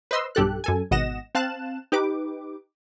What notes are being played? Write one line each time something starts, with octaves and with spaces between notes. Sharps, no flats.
B4 C5 D#5 C6 E6
B1 G2 G4 A4 F#6
F#2 A4 G#5
G#1 B2 D#5 F#5 A#6 E7
C4 F5 A5 F#6 E7
D#4 G4 B4 D6